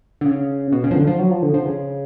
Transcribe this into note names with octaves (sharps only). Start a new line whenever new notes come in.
D3
C#3
B2
C#3
F3
D3
F3
F#3
F3
D3
F3
C#3